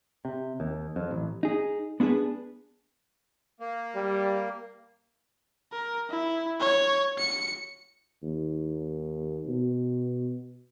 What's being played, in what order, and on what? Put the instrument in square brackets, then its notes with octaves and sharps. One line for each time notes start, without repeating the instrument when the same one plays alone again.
[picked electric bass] C3
D#2
F2
A1
[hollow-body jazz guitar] D#4 G#4
B3 D4 E4 G#4 B4
[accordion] A#3
[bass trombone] G3
[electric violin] A#4
E4
C#5
C#7
[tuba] D#2
B2